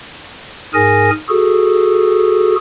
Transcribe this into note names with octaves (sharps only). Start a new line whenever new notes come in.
G#2 G#4 A#4 G#5 A#6
F#4 G#4 A4